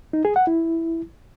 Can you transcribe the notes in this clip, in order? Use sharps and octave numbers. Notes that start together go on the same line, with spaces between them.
D#4
G#4
F#5
E4